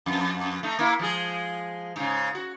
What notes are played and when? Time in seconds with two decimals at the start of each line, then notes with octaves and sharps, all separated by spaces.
0.06 F2
0.63 A3 D#4
0.79 A#3 E4
0.99 F3 G#3 G#4
1.96 G#2 C#3
2.35 F#4